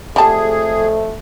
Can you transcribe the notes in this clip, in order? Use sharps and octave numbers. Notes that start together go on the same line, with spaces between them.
F2 G3 A3 G#4 A5